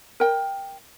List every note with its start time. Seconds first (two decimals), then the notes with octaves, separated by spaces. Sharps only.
0.20 A#4 G5